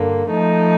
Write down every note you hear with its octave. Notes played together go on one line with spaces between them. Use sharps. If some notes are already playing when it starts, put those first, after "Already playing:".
Already playing: G2 D3 A#3
F3 A3 D#4